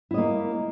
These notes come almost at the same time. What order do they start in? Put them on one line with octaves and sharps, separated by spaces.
E4 D#5 A#3